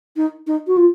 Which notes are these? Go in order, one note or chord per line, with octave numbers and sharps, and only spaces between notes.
D#4
D#4
F#4
F4